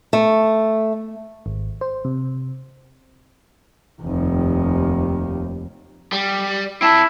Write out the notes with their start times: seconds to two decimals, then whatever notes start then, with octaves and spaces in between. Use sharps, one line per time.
0.13 A3
1.46 G#1
1.81 C5
2.05 C3
4.02 F1 D#2
6.12 G3
6.82 C4 E4 A5